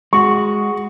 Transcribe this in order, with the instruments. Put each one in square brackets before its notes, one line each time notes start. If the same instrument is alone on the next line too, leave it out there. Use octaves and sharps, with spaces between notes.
[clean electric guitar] G#3 F#4 [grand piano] C#6